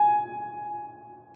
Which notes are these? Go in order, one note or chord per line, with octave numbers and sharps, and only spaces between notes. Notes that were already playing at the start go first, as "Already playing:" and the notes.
Already playing: G#5